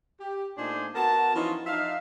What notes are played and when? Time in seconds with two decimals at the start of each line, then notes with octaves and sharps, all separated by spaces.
0.21 G4
0.57 A#2 A3 D4 D#4 C5 G#5
0.95 B3 F#4 A#4 A5
1.36 E3 F3 C#4 D#4 F4
1.66 F3 D#4 E5 F5